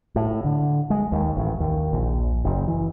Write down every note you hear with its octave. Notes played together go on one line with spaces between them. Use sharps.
A2
D3
G#3
D#2
A1
D#2
A#1
F#1
E3